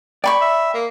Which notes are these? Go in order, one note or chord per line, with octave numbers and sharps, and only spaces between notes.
D5 G5 B5 C#6
E5
A#3